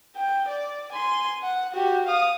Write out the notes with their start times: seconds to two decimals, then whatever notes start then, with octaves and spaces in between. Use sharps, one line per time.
0.16 G5
0.48 D5
0.92 G#5 C6
1.43 F#5
1.73 F#4 G4
2.06 F5 D#6